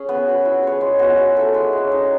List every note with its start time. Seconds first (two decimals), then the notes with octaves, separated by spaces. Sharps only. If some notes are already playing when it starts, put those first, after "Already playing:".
Already playing: C#4 G#4
0.09 B3
0.27 F#4 B4
0.45 E4
0.63 G#4 C#5
0.81 G#3
0.99 B3 F#4
1.18 E4
1.37 A4 E5
1.54 G#3
1.73 C#4 G#4
1.92 D#4